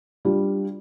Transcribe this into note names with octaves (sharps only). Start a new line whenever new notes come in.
G3 D4 F4